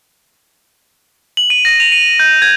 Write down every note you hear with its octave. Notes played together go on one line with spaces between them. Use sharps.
F#7
D#7
A#6
F7
D#7
G6
G#6